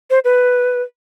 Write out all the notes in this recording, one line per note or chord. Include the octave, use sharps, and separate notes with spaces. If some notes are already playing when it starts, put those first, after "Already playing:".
C5
B4